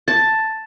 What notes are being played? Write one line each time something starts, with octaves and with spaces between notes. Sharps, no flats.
A5